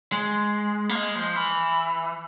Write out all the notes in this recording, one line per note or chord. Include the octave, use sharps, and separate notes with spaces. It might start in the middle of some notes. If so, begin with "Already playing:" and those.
G#3
A#3
G#3
F3
E3